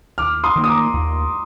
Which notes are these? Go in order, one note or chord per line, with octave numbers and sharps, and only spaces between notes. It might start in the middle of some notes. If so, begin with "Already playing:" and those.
D#2 D6 F6
C6 D#6
D#3 A#3
D#6
A#5 D6
D#2